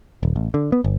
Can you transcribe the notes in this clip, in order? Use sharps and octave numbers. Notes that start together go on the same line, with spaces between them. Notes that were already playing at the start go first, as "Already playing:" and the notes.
D#1
A1
D3
B3
G1